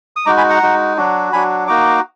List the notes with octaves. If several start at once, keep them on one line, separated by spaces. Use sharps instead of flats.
D#6
G#3 D#4 F#4 A#5 D6
G#5 B5
F#5 A#5
G#3 D#4 F#4
F#3 D4 F#4
F#3 D4 F#4 G#5 B5
A#3 D#4 F#4 A#5 D6